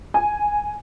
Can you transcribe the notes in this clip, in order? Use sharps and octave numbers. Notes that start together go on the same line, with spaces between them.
G#5